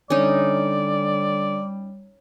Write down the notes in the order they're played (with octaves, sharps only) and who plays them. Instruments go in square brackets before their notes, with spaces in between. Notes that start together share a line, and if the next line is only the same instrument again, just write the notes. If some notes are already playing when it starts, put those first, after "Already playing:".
[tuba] D3 [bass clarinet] G3 [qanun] C#4 D#4 [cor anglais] D5